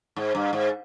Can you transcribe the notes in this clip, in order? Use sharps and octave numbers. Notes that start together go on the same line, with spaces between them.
G#2
G2
G#2